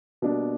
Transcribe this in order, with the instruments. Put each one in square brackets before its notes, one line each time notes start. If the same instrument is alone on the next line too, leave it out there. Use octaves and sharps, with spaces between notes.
[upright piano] B2 G3 A#3 D4